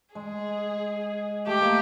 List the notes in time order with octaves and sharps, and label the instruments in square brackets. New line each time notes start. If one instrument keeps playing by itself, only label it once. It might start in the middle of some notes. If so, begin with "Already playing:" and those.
[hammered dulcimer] G#3 [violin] G#4
[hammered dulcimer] A3 [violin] G4
[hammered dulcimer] A#3